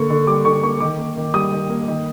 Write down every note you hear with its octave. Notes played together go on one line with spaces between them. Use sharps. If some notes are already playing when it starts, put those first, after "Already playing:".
Already playing: D3 A#3 C#6
D3
G3 D6
D3 C#6
A#3 C#6
D#3 D6
A#3
D#3
G3 D#6
D#3
A#3
D#3